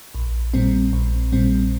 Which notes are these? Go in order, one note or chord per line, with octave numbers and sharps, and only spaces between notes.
A#1
A#2 G3 C4
A#1
A#2 G3 C4